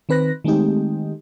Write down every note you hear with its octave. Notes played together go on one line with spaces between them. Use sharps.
D#3 C4 B4 F#6 A#6
D#3 G#3 A3 C4 D#4 G4